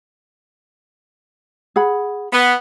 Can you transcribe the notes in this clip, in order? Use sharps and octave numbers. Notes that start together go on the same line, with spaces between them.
G#4 F#5 B5
B3